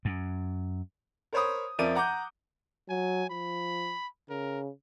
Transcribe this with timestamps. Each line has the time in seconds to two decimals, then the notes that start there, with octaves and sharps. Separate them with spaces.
0.05 F#2
1.33 A#4 C5 C#5 B5 D#6
1.78 F2 F3 A#4 D5 E5 D#7
1.95 F#5 A#5 D6 G6
2.89 F#3 G#5
3.30 F3 B5
4.30 C#3 A#4